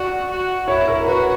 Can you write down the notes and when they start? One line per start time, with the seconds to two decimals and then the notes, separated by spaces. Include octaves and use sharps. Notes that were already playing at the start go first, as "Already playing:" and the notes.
Already playing: F#4 D5
0.30 F#4
0.68 E4 C#5
0.88 A#4
1.06 F#4 B4